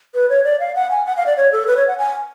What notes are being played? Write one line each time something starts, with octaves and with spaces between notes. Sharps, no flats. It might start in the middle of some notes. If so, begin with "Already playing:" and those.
B4
C#5
D5
F5
F#5
G#5
F#5
F5
D5
C#5
A4
B4
C#5
F#5
G#5